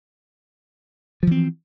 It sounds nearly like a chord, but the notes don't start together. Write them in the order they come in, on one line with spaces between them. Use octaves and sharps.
F3 E3 C4